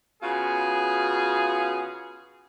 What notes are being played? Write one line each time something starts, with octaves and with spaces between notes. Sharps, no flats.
C#3 B3 F4 F#4 G#4